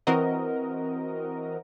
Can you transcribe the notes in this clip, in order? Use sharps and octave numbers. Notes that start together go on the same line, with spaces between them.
E3 C4 F#4 A#4 D#5